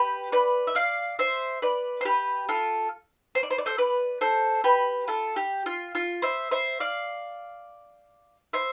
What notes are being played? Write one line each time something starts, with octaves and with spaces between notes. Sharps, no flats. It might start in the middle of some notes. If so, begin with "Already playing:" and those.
Already playing: G4 B4
B4 D5
E5
D5 F5
C5 E5
B4 D5
C5
G4 B4
F4 A4
C5
D5
C5
D5
A4 C5
B4 D5
A4 C5
G4 B4
F4 A4
G4
F4
F4
C5 E5
C5 E5
D5 F5
C5 E5